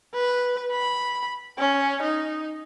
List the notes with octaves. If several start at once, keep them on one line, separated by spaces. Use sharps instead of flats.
B4
B5
C#4
D#4